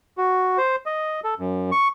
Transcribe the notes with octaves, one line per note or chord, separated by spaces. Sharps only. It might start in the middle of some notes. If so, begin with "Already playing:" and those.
F#4
C5
D#5
A4
F#2
C#6